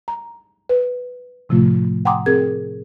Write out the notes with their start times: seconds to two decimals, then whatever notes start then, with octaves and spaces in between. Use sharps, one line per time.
0.08 A#5
0.69 B4
1.49 A2 C3 F3 A3 F4
2.05 F#5 G5 A#5 C6 D6 D#6
2.26 C4 G#4 A#4 G#6